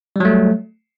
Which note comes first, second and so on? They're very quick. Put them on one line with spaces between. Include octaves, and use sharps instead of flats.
G3 F#3 A3